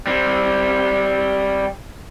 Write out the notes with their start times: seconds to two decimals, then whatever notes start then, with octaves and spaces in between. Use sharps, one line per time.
0.07 G3 C4